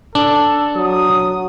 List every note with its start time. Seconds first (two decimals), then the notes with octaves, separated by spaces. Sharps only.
0.15 D4 A4
0.76 F#3 D#6